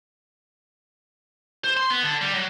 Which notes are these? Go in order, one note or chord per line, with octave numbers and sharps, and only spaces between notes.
C5
C6
B3
D3
G3
F#3